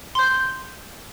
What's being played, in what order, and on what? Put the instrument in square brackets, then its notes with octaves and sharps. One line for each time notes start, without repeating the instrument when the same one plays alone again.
[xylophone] C6 G6